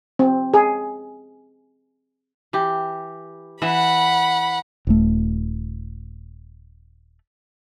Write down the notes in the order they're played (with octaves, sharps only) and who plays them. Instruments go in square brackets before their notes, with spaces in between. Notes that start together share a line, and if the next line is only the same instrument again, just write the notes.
[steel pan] C4
G#4
[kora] E3 G4
[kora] E3 E5 [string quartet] F#5 B5
[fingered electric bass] D#1 A3